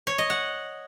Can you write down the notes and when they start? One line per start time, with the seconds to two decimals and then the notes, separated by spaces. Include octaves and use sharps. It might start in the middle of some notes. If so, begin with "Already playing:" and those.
0.07 C#5
0.18 D#5
0.30 F#5